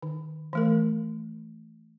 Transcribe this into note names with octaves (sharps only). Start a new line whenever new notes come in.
D#3
E3 A3 A#4